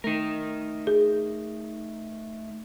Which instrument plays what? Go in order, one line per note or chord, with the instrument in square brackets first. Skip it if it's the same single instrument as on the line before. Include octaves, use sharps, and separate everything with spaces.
[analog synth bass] A3 [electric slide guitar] D#4 A#4
[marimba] G#4